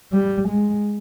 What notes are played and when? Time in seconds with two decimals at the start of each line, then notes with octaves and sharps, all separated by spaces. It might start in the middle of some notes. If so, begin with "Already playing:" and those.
0.13 G3
0.49 G#3